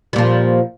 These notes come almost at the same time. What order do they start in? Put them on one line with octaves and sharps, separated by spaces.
G3 A#2 F3